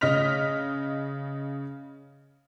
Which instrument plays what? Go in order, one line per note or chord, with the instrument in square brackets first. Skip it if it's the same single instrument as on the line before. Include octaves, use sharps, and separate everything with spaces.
[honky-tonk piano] C#3 D#5 F6 B6 F7